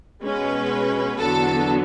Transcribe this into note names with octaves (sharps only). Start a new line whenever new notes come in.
B2 G#3 C#4 B4
E2 D3 F#3 B3 A4